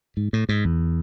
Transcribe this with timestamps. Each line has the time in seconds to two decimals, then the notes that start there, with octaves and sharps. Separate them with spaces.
0.17 G#2
0.33 A2
0.49 G#2
0.65 E2